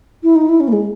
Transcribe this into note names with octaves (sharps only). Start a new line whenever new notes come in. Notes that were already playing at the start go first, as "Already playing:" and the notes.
E4
D#4
E4
C#4
A#3
G#3